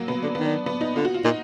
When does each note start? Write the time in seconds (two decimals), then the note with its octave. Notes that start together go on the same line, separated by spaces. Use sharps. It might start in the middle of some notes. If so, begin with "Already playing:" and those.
Already playing: F#3 A#3
0.08 B2 B3
0.23 D3 D4
0.35 D#3 B3
0.45 D4
0.66 B3
0.81 D#4
0.96 D3 F4
1.05 F#4
1.14 F4
1.24 A#2 D#4